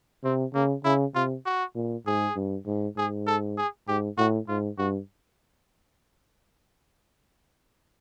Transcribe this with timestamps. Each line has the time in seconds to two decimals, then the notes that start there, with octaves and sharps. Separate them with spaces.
0.24 C3 C4
0.54 C#3 A#3
0.84 C#3 E4
1.15 C3 F4
1.46 F#4
1.75 A#2
2.06 G#2 G#4
2.36 G2
2.66 G#2
2.97 G#2 G#4
3.27 A4
3.58 G#4
3.88 G#2 G4
4.17 A2 F#4
4.48 G#2 F4
4.78 G2 F#4